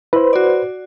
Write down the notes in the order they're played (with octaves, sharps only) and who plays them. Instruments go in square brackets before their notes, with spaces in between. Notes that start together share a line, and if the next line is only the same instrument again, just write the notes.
[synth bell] E4 [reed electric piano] B4 C5
[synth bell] F#4 D5